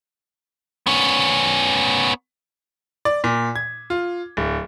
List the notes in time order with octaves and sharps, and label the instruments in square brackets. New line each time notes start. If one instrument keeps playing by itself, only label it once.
[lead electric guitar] B3 C#4
[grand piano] D5
A#2
G#6
F4
D1